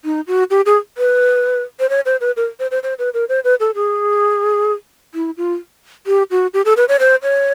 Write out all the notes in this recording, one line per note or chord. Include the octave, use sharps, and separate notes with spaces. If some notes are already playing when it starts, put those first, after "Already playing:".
D#4
F#4
G4
G#4
B4
C5
C#5
C5
B4
A#4
C5
C5
C5
B4
A#4
C5
B4
A4
G#4
E4
F4
G4
F#4
G4
A4
B4
C#5
C5
C#5